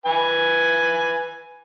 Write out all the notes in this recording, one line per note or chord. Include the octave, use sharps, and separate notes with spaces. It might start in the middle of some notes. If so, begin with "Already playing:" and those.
B4 G#5